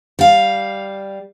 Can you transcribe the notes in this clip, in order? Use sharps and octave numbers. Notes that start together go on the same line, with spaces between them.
G3 F5